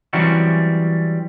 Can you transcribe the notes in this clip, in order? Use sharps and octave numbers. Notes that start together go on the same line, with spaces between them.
E3 F#3 G3 C4 C#4 F#4